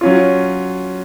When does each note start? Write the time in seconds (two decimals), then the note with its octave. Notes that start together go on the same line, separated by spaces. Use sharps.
0.01 F#3 C#4 F4